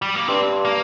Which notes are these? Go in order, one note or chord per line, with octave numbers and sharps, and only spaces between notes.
G3
A#3
G2 C4
A#3